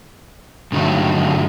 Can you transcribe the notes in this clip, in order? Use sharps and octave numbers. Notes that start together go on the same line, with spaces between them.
G2 D3 D#3 F#3 A3